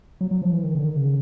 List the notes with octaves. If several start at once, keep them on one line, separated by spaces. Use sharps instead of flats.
F#3
F#3
F3
E3
D#3
D3
D#3
C#3